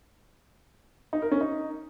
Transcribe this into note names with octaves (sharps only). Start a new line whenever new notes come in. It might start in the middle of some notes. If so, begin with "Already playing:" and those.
D#4
A#4
C#4
D#4